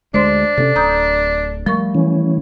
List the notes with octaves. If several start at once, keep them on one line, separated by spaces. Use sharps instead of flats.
D2 G#3 D4 C5 C6
C3 C4 C#4 A4
D1 A#5 D#6 G6
F3 G3 A3 A#4 C#6
E3 C#4